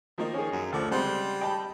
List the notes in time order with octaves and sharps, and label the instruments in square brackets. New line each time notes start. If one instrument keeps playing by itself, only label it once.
[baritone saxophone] D#3 [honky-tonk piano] F3 A#3 D#4
[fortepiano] C#4 G#4
[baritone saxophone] F#2
[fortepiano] D2 A4 D6 [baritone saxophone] F3
[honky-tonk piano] C#3 G#3 C4 [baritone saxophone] G3 [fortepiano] C5 F#5 C6
[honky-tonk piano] D#5 [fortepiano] G5 A5 B5